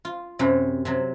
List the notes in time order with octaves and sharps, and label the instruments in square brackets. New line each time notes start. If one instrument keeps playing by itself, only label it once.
[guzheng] F4
F#2 C3 F#3
C3 F#3